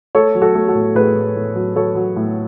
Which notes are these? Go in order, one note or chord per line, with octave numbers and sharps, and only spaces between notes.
A3 A4 C#5
F#3
F#4 A4
A3
F#4 A4
A2
A2 G#4 B4
A2
A2
F#3
F#3 A4 C#5
F#3
A2